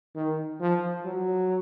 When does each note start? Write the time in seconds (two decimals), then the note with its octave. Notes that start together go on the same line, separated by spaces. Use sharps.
0.16 D#3
0.61 F3
1.05 F#3